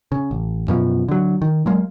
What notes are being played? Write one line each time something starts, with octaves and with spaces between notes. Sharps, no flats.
C#3
A1
F#2 B2 F3
D3 F#3
D#3
F#3 G#3 A#3